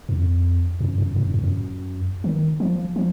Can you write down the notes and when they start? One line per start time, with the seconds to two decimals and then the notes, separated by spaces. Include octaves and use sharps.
0.09 F2
0.81 F#2
0.98 F#2
1.16 G#2
1.25 F#2
1.34 F2
1.43 F#2
2.24 D#3
2.60 F3
2.96 F3